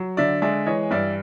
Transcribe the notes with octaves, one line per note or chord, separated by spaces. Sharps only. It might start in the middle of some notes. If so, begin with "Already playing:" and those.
Already playing: F#3
D3 D5 E5
G#3 D5 E5
E3 C#5 D#5
G2 D5 E5